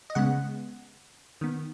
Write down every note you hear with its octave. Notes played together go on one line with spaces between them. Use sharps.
D#5
C#3 G#3 B3 F#5
D#3 B3